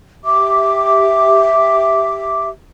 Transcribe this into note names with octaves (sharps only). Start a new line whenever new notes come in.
G4 E5 D6